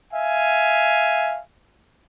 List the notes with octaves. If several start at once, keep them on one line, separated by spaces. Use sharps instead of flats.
E5 F5 G#5